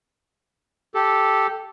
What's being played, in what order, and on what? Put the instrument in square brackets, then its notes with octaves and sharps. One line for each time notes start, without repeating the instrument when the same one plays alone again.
[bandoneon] G4 A4